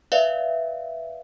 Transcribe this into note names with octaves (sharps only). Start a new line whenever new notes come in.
B4 D5 E5 F5